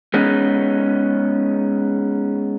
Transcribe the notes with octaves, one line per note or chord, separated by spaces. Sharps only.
G#3 B3 C#4 D#4